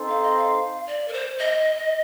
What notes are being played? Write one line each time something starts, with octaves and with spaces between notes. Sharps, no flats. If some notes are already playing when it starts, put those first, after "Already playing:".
Already playing: C4 D#4 A4 C5
F5
D#5
F5
D5
A#4
C5
D#5